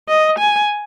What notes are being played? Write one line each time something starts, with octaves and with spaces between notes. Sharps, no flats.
D#5
G#5